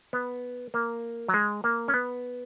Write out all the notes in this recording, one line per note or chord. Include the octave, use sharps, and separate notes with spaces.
B3
A#3
F#3
G#3
A#3
C#4
B3